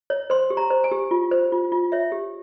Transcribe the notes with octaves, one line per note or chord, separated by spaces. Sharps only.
C#5
C5 C6
G4
A#5
C5
G#5
G4
F4
C5
F4
F4
C#5 E5
G4